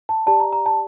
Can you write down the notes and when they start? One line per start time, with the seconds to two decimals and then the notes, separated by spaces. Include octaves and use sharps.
0.09 A5
0.27 G4 D5 A5
0.40 A#5
0.53 A#5
0.66 A5